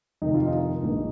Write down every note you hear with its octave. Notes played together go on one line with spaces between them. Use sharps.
F1 F2 C3 D#3 D#4
F4
D#4
A#1 A#2